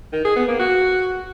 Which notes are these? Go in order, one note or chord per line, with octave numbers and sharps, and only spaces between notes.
D#3
G#4
B3
A#3
F#4